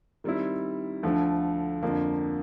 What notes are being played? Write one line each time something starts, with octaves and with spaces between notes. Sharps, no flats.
D#3 G3 C4 E4
D2 D3 F3 A3
F2 D3 F3 A#3